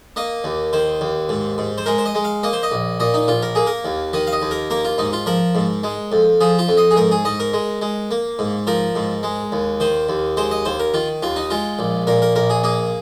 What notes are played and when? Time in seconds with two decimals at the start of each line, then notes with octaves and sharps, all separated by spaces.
0.16 A#3 D#5
0.44 D#2
0.73 D#3 C5
1.01 D#2
1.29 G#2
1.58 G#2
1.78 C5
1.86 G#3 A#4
1.98 C5
2.06 D#5
2.15 G#3
2.24 F5
2.43 A#3 D#5
2.53 C5
2.63 D#5
2.71 A#1
3.00 A#2 D#5
3.14 D#4
3.28 A#1 F4
3.42 A#4
3.55 A#3 G#4
3.67 A#4
3.85 D#2
4.13 D#3 D#5
4.27 F5
4.32 D#5
4.42 D#2
4.51 A#4
4.70 A#3 A#4
4.85 F4
4.98 G#2 D#4
5.13 F4
5.26 F3 A#4
5.55 G#2
5.83 G#3
6.12 F2
6.40 F3 G#4
6.59 F4
6.68 F2
6.77 D#5
6.91 G#4
6.96 G#2 A#4
7.11 G#4
7.25 G#2 D#5
7.40 A#4
7.53 G#3
7.81 G#3
8.11 A#3
8.39 G#2
8.67 F3 A#4
8.96 G#2
9.23 G#3
9.52 D#2
9.80 D#3 C5
10.09 D#2
10.37 G#3 C5
10.51 D#5
10.65 D#2 C5
10.80 A#4
10.94 D#3 F4
11.22 D#2 F4
11.36 D#4
11.50 G#3 F4
11.79 A#1
12.07 A#2 A#4
12.22 A#4
12.35 A#1 A#4
12.50 G#4
12.63 A#3 G#4